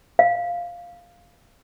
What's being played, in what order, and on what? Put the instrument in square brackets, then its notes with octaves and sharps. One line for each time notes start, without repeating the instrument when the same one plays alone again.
[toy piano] F5